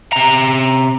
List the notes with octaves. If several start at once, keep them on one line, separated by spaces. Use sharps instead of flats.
C3 A#5